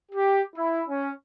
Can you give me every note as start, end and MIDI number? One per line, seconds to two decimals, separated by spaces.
0.12 0.43 67
0.55 0.80 64
0.89 1.10 61